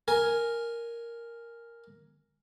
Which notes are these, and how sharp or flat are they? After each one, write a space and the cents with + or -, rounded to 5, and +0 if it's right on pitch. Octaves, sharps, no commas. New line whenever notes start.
A#4 +0 G#5 +0